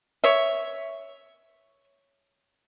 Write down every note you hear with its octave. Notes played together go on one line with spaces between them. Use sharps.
C#5 E5